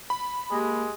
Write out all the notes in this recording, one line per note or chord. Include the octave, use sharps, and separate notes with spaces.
B5
G#3 A#3 G4